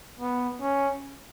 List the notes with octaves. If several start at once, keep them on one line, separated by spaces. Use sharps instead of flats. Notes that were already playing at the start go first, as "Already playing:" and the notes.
B3
C#4